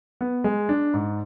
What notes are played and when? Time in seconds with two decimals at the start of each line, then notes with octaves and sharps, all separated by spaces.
0.21 B3
0.44 G#3
0.69 D4
0.94 G#2